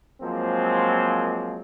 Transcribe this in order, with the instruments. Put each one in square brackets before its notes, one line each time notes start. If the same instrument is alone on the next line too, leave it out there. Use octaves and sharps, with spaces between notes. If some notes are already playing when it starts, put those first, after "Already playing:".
[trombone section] F3 F#3 G#3 A#3 C4